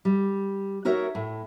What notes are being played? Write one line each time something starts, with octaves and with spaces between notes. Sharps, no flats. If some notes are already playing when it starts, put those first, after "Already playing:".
G3
D#4 F#4 A#4 C#5 E5
A2